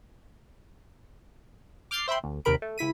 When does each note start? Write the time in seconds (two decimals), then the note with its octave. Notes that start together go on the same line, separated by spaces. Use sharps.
1.91 D6 F6 G6 A6 C7
2.08 C5 E5 G5 B5 C6
2.24 D2
2.45 D#2 C3 D#3 A#4 B5 D7
2.62 A3
2.78 C#2 E4 B6 D#7